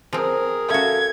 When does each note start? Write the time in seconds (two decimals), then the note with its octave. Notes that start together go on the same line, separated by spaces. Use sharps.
0.13 F3 C4 G#4 A#4
0.70 C#4 F#4 A4 E5 F5 G#6